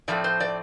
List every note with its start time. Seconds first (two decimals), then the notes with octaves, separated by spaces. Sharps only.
0.08 A2 F3 A3 C4 D5
0.24 C5
0.40 D5